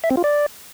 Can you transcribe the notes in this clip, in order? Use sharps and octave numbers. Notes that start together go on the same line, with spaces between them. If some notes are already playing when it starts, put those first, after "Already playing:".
E5
C4
F4
D5